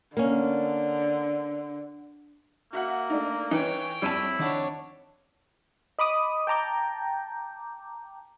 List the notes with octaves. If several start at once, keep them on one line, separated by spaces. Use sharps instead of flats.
D3 A#3 C#4
A#3 F#4 E5 F#5
A3 D4 D#4
E3 D#4 B4 C#5 G5
F2 G3 E4 G#5 A5
D#3 D4 C#5 F#5
D#5 B5 D6 D#6
G5 A5 A#5 D6 G6